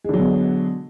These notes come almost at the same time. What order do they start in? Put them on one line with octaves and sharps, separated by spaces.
G#3 D3 F#3 B2